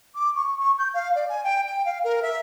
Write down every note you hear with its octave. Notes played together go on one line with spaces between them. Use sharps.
D6
C#6
C#6
G6
F5
D5
G#5
G5
G5
F5
A#4
E5